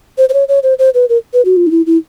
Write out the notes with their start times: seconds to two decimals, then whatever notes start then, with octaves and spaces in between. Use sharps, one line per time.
0.18 C5
0.29 C5
0.34 C#5
0.48 C#5
0.63 C5
0.79 C5
0.95 B4
1.09 A#4
1.33 B4
1.45 F#4
1.57 F4
1.67 D#4
1.71 E4
1.86 E4